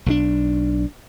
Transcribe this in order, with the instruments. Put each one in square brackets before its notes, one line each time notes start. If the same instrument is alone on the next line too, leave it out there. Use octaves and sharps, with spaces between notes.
[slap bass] B1 F3 D4